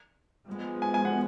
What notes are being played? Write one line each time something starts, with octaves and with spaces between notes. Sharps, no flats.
F3 G#3 B3
G#5
G#5
F#5